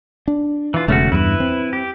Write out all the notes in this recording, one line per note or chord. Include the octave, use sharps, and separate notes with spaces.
D4
E3 F4
E1 C#3 A3 C#4 F#4
E2 G2 E4 B4
C4
G4